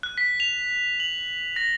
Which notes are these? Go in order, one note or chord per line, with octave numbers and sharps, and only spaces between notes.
F#6
B6
F7
F#7
A#6